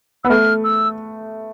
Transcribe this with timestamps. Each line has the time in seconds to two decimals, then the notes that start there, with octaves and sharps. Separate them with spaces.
0.24 B3 E6
0.29 A3 F6
0.64 E6